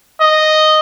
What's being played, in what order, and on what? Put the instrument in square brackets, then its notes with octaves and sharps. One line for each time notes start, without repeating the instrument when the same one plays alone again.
[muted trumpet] D#5